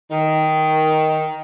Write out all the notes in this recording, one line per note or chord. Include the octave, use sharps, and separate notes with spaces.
D#3